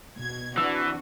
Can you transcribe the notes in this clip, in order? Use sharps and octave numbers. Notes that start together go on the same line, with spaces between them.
B2 G#6
E3 C4 D4 F#4 E6